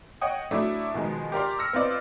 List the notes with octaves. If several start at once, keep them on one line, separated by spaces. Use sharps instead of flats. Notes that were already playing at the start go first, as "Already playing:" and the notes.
C#5 D#5 F#5 G5 D#6
F#3 A3 D4 E4 D5 E5
B2 D#3 F3 G#3
G4 A#4 D5 C6
E6 F6 A#6 C#7
B3 C4 F4 D5 D#5